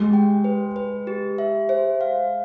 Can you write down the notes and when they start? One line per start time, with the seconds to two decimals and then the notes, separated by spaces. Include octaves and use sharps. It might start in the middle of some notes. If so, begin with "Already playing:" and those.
Already playing: G#3 G4
0.13 G5
0.44 B4
0.76 B4
1.07 G4
1.38 E5
1.69 C5
2.01 F5